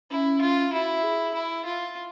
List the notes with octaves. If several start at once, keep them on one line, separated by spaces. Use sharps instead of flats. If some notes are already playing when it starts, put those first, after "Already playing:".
C#4 E4
F4
E4 F#4
G#4
E4
F4